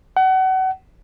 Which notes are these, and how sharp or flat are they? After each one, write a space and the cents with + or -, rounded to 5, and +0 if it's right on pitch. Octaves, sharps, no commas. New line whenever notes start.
F#5 +30